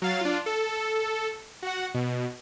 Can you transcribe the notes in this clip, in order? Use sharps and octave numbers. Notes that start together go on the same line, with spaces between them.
F#3 F5 A6
D4 F4
A4
F#4 F#5
B2